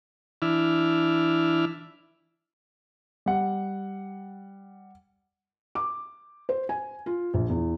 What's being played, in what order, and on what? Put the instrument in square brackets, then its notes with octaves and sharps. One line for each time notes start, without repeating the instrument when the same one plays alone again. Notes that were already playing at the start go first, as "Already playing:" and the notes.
[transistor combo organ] E3 D4 E4 F6
[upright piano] G3 F#5
[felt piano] D6
C5
G#5
F4
A#1
E2